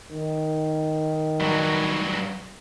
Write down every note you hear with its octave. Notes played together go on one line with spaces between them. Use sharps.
D#3
G2 F#3